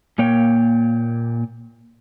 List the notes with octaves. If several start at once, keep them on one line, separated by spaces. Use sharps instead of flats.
A#2 A#3 C#5 G5